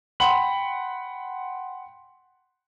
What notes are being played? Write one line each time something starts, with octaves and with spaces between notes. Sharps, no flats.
F#5 G5 B5 C6 F#7